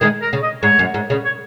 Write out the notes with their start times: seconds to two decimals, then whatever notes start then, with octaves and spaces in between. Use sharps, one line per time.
0.01 D#3 G#3 G#4
0.22 A#4
0.33 C#3
0.43 D#5
0.63 G#2 C#5
0.79 F#2
0.94 G#2
1.10 C#3
1.25 C#5